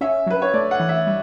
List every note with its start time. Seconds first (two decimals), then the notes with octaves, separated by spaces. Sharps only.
0.01 C#4 E5
0.26 F#3 B4
0.42 C#5
0.53 A3 D5
0.71 F#5
0.80 E3
0.89 E5
1.07 G3